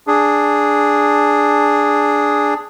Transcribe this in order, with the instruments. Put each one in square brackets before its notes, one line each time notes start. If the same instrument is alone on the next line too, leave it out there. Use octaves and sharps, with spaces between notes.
[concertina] D4 G#4